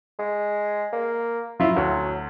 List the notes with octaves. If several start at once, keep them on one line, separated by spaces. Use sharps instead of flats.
G#3
A#3
F#3 E4 F4
D2 F#3